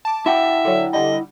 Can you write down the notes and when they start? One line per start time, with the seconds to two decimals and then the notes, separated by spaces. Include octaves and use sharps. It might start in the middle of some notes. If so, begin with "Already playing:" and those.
0.05 A5 D6
0.26 E4 E5 F#5 G5
0.65 D3 F#3
0.93 D3 G3 D#5